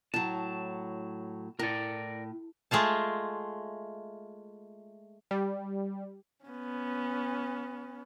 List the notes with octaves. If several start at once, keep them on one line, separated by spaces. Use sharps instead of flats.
A2 F#3 A5
A2 A#4 D5
G#3 A3 F4 A5
G3
B3 C#4